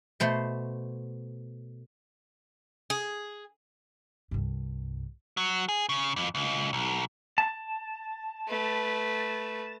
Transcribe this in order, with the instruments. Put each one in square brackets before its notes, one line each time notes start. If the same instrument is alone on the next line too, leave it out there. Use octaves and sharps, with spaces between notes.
[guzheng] B2 A3 C5 C6
[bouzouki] G#4
[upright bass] C2 G2
[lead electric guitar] F#3
G#4
C#3
F2
C#2
B1
[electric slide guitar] A5
[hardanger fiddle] A3 B4